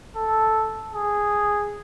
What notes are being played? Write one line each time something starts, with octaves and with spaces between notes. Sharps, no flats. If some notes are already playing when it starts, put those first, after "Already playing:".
A4
G#4